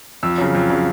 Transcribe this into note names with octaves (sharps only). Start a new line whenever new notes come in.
F2 E6
C#3 F#3
F2
C#3 F#3